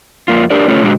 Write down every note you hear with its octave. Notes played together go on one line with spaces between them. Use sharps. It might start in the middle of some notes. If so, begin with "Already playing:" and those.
F2 A#3 F4
D4 G4 A#4 D5
A3 C#4 F4 A4 C#5
A#2 D3 G#3 D4 F#4 G4